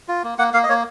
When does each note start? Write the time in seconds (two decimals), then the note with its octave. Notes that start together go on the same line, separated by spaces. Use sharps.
0.08 F4
0.23 A#3
0.38 A#3 F#5
0.54 A#3 F5
0.63 D#5
0.69 A#3 C#5